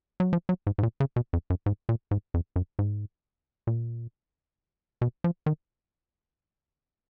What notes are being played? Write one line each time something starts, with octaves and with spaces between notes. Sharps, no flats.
F#3
F3
F#3
G#2
G#2
A#2
C#3
B2
F2
F#2
G#2
A#2
G#2
F2
F#2
G#2
A#2
B2
F3
D#3